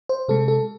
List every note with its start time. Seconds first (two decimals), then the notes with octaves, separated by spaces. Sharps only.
0.09 C5
0.28 C3 G#3 A4
0.48 A4